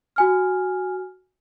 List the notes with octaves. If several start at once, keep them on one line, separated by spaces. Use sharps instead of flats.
F#4 G#5 F6